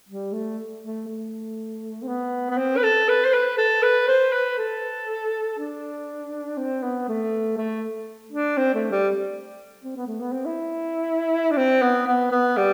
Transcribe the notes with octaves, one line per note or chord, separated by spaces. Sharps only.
G3
A3
A3
A3
C4
B3
B3
C4
B4
A4
B4
C5
B4
A4
B4
C5
B4
A4
D4
C4
B3
A3
A3
D4
C4
A3
G3
C4
B3
A3
B3
C4
E4
D4
C4
B3
B3
B3
G3